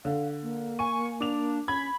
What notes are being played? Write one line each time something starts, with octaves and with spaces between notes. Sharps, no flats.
D3 F5
A#3
G#5 C#6 D#7
D4 D6 F7
C#4 B5 G#6